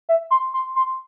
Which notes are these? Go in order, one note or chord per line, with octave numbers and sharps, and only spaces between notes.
E5
C6
C6
C6